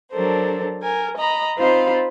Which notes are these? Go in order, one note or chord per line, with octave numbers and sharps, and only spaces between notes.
F#3 D4 A4 A#4 C5
A#4 G#5
D#5 A#5 B5
C4 D#4 F4 C5 F5 B5